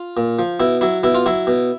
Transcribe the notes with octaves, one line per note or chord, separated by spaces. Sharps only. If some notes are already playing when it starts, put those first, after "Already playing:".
Already playing: F4
A#2
F3
B2 E4
F#3 E4
B2 E4
F4
F#3 E4
B2